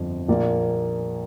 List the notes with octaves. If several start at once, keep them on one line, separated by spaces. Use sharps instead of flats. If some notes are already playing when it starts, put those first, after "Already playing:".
Already playing: G1 F2 F3
A#1 A#2 A#3 F4 D5